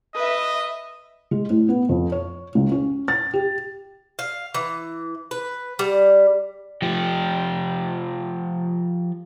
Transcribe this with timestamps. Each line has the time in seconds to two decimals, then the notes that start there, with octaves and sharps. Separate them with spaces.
0.15 B4 D#5 E5
1.31 G#3
1.50 A2
1.69 B3
1.89 F2
2.12 C#5
2.55 C#2
2.72 C#4
3.08 A6
3.34 G4
4.19 F5
4.55 E3
5.31 B4
5.79 G3
6.82 F3 G4